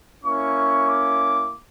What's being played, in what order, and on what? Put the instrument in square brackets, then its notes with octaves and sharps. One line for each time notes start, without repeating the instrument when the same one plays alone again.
[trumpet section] A#3 C#4 E4 C#6
D6